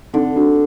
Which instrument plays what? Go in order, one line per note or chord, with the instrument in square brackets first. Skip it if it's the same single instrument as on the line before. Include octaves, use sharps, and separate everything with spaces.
[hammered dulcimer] D3 [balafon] C4 D#4
[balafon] D4 F#4